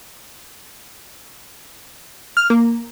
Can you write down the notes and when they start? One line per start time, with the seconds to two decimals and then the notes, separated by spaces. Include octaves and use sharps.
2.37 F6
2.50 A#3